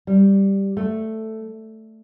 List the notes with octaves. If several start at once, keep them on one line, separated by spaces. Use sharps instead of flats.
G3
A3